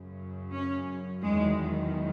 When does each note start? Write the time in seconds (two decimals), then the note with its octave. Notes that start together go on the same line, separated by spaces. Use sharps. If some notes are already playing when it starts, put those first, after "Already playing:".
Already playing: F#2 C#3 F#3
0.53 C#4
1.21 E2 D#3 F#3 G#3